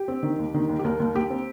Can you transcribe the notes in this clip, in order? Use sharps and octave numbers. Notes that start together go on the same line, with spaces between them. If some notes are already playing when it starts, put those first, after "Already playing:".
Already playing: G4
C4
D#3
D#2
D#3
D#2
G4
D#2 A#4
D#2
D#2 G4
C4